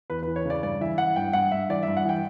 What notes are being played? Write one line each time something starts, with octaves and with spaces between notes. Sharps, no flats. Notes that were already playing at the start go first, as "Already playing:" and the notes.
E2 B4
E3 B4
C#5
C#3 D5
G2 D5
E3 E5
E3 F#5
G2 G5
G2 F#5
G2 E5
E3 D5
E5
G2
F#5
E3 G5